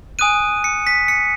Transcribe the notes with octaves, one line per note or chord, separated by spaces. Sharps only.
G#5 D#6 F#6 D#7
C#7
B6
C#7